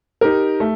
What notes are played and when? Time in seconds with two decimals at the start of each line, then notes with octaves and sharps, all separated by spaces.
0.21 D#4 G4 A#4
0.60 A3